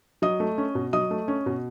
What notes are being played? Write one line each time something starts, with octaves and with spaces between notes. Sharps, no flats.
F#3 D#5 D#6
A3
C#4
B2
F#3 D#5 D#6
A3
C#4
B2